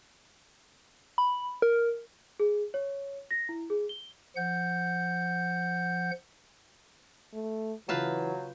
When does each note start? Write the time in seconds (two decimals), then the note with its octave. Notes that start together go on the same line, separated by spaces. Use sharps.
1.18 B5
1.62 A#4
2.40 G#4
2.74 C#5
3.31 A#6
3.49 E4
3.70 G#4
3.89 G7
4.36 F3 F#5 G6
7.33 A3
7.89 C#3 E3 F#3 F4 B4 F5 A5 G6